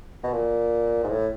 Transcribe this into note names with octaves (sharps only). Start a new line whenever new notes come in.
B2
A#2
G#2
A2